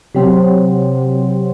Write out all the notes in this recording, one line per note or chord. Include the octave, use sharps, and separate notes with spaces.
C3 F#3 C4